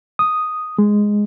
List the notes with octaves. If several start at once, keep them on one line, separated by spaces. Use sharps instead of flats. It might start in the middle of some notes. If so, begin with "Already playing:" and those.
D#6
G#3